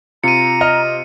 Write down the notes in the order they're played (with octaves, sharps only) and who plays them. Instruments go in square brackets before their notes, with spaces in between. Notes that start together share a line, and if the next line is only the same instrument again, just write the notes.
[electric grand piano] C3 F4 [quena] A#5 [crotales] C#7 D#7
[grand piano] D#5 F6